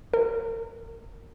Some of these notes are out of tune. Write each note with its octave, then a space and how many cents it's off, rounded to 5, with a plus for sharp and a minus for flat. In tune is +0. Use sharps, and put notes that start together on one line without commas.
A#4 -30